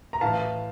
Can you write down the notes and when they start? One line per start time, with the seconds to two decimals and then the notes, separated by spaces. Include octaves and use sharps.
0.13 A#5
0.21 A2 E3 F5 A5